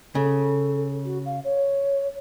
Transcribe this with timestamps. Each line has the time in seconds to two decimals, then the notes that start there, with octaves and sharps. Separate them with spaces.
0.15 C#3 A4
1.05 F#4
1.25 F5
1.44 C#5